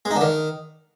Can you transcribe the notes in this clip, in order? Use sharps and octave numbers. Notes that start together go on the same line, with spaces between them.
G#3
D#4
D3
D#3